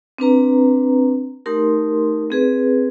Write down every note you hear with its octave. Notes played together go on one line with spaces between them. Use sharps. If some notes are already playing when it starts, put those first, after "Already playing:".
C4 D4 B4 A#5
A3 D#4 G4 A#4 C6
C4 G#4 B4